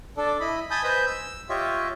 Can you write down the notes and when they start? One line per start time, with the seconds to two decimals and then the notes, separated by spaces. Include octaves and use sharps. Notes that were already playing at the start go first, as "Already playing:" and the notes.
0.17 D4 A4 D5
0.40 E4 D#5 B5
0.71 G#5 A5 B5 D#6 G6
0.84 B4 C5 D#5 G#5 G6
1.07 E6
1.49 F4 G4 C#5 D#5 E5